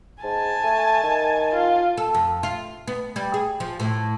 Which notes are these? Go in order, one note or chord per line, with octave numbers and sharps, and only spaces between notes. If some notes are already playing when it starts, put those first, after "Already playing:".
G#2 G#5 A5
A3
D#3
F4
A4
F2
F4
B3
G3
G#4
F3
A2